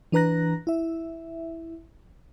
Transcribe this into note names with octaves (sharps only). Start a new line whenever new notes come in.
E3 D4 B4 A#5 F#6 A#6
E4 E5